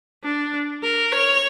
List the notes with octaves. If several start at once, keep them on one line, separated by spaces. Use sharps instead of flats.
D4
A#4
C#5